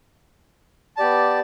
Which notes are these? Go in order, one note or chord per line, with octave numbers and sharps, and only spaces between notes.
B3 G4 D5 A5